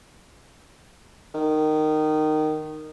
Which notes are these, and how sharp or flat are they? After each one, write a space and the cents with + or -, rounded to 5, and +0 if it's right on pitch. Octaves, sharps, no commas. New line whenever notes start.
D#3 -15